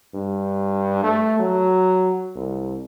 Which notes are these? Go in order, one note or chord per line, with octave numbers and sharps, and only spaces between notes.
G2
A3
F#3
C2